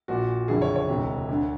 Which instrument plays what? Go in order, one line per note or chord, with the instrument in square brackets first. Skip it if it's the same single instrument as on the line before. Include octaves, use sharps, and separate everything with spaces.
[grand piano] A#1 A#2 F#4
F#1 F2 D3 G#4
C#5
C#5
E1 D2 C3
D2 D3